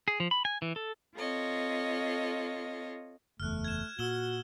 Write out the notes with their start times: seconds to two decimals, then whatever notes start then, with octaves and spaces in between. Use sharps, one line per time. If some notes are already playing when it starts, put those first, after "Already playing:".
0.08 G#4
0.20 F3
0.31 B5
0.45 G#5
0.62 E3
0.76 A4
1.15 C4 F4 A4 C#5 D#5
3.40 F#1 E2 A3 F6 F#6
3.64 G#6 E7
3.99 A#2 F#4 E6 E7 G7